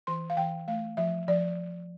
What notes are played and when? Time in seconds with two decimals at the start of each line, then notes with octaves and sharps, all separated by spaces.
0.07 E3 C6
0.30 F5
0.37 E3 G5
0.68 A3 F5
0.97 F3 E5
1.28 F3 D5